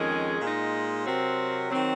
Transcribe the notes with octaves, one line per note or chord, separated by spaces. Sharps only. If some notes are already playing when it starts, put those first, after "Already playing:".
Already playing: F2 D#3 G#3 C#4 G#4
A#2 G#3 D#4
C3 F#3 C4 F#4 A#4
D#3 F#3 C4